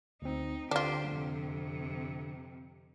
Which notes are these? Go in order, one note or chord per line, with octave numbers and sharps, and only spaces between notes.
D2 C4 D#4
D3 D4 F4 G4 C5
F2 C3